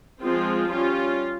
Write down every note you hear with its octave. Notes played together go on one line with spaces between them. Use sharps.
F3 G#3 C4 F4
G3 C#4 F4